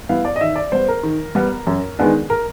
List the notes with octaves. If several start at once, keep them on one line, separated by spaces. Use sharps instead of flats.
G3 B3 E4 F5
D5
D#5
D#3 E5
D5
G3 B3 C5
A#4
D#3
G3 B3
F#2
D#3 G#3 B3 D4
A#4